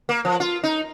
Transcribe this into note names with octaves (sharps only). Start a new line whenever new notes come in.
A#3
F3
F4
D#4